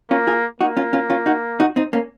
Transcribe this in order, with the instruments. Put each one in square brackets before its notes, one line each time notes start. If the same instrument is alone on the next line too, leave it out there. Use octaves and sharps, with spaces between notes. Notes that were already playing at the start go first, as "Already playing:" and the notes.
[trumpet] A#3 [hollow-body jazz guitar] C#4 F4
[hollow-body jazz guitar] F4 G#4
[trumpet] A#3 [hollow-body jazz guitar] D#4 F#4
[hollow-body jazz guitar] C#4 F4
C#4 F4
C#4 F4
D#4 F#4
D#4 F#4
C4 D#4
A#3 C#4